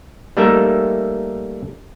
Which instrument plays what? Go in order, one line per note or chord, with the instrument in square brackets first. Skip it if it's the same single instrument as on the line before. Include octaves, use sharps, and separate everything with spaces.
[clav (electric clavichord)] G3 A3 A#3 D#4 A#4 E5